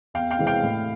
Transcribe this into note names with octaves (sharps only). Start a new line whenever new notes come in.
E2 F5 G5
F5 G5
C3 E3 G#3 C4
F5 G5
A2